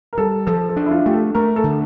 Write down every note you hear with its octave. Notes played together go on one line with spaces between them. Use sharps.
A#4
G3 A4
F3 A4
A4
D4
E4
F4
A3 G4
A4
A3 A#4
A4
D3